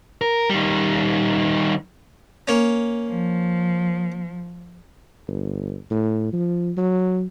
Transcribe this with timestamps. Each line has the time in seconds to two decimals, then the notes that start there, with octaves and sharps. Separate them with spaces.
0.21 A#4
0.50 D#3 G3
2.48 A#3 C#4
3.08 F3
5.28 G1
5.90 A2
6.33 F3
6.77 F#3